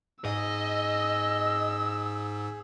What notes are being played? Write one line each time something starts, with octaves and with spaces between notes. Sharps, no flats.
G#2 G#4 D#5 E6